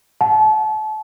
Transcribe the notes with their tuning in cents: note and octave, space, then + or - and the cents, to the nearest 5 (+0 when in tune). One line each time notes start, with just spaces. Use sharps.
F#5 -30 A5 -30